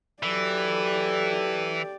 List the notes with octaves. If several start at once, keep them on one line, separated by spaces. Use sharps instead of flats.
E3 F#3 G4 A4 D5